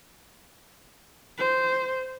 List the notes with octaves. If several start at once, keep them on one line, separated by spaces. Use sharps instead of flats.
C5